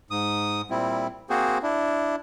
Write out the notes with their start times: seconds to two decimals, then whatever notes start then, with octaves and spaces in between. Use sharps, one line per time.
0.11 G#2 D#6
0.70 A#2 G3 C4 E4
1.30 A#3 C4 F#4 G#4 C5
1.63 D4 E4